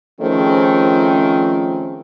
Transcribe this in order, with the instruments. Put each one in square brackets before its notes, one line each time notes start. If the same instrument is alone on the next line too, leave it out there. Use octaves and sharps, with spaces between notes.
[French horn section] D#3 F3 A3 C4 C#4 G#4